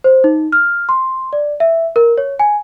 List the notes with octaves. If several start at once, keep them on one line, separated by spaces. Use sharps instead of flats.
C5
D#4
F6
C6
D5
E5
A#4
C#5
G#5